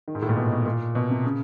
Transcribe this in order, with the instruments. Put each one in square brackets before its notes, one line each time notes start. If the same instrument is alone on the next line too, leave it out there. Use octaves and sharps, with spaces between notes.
[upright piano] D#3
G#2
A2
A#2
B2
B2
A#2
B2
C3
C#3